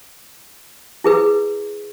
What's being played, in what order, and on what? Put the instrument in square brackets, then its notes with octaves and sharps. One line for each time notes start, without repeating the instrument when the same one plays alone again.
[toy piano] E4 G#4 B4 E6